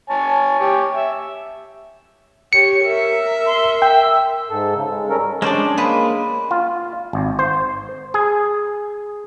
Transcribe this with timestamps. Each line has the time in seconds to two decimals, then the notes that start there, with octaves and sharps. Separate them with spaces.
0.10 C#5 G#5 A5
0.60 G4 C#5
0.93 E5
2.53 G4 C#5 C#7
2.85 A#4 E5
3.46 C6
3.82 G5 E6
4.50 G#2 A4
4.75 C#3
4.89 G#3
5.09 G3 C#4 A4 A#4
5.42 G#3 C#4 D4 C5 D5
5.77 G#3 A#3 B4
6.51 F4
7.13 G#1
7.39 C5
8.14 G#4